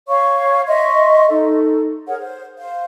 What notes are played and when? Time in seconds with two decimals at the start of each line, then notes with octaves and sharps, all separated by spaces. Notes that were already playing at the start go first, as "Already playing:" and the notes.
0.08 C#5 F5 C#6
0.67 D#5 E5 C6 C#6
1.29 D#4 A4
2.07 G#4 A#4 C#5 F#5
2.18 C5
2.58 C5 F5